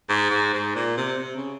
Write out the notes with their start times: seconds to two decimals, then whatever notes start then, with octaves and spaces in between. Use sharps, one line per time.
0.09 G#2
0.30 G#2
0.53 G#2
0.75 A#2
0.97 C3
1.19 C3
1.36 C#3